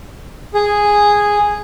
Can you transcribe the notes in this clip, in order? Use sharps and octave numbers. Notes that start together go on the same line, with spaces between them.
G#4